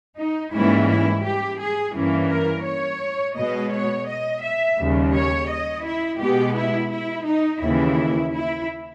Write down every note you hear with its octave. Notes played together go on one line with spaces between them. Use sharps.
D#4
G#2 E3 G3 A#3 C#4 E4
E4
G4
G#4
G2 E3 A#3 C#4
A#4
C#5
B2 G#3 B3 D#5
C#5
D#5
E5
D#2 C#3 G3
C#5
D#5
E4
B2 G#3 B3 G4
E4
E4
D#4
D#2 C#3 E3 E4
E4